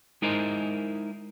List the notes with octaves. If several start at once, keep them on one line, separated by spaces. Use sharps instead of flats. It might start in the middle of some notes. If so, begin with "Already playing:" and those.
G#3 D#4 E4 A#4 C5 D#5